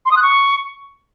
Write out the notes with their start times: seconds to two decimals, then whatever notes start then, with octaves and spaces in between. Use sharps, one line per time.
0.06 C6
0.11 D#6
0.17 F#6
0.22 C#6